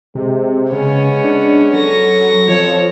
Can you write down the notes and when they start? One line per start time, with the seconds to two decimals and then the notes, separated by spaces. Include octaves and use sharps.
0.15 C3 G#3
0.72 C#3 G#3 B3 C#4 C#5
1.24 D4
1.74 F#3 A4 C#6 A#6
2.48 F2 F3 A4 C#5